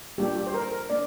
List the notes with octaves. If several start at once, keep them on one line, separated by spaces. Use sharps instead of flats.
G3 A#3 D4 F4 G4
G4
C5
A#4
A#4
A#3 D4 D5